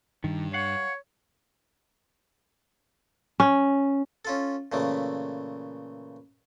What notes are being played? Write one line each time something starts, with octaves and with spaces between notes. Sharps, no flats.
G2 D#3
C#5 F5 F#5
C#4
C#4 F4 A4
A#2 C#3 E3 A3